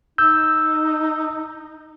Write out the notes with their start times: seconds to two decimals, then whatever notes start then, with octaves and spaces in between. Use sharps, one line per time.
0.18 D#4 E6 G6